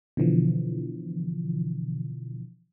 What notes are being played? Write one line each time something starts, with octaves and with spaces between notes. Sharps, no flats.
B2 D3 E3 F3